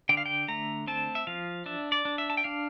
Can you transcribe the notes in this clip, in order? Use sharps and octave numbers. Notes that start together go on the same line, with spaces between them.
D3 G5
F5
G5
A3 A#5
C4 A5
E5
F3 F5
D4 E5
D5
D4
E5
A5
G5
D4 F5